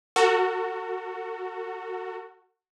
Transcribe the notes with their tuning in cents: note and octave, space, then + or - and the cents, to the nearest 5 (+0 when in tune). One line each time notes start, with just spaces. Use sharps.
F#4 +0 A4 +45